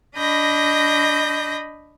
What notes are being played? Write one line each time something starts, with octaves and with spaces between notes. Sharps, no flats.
D4 D#5 B5 G6 A#6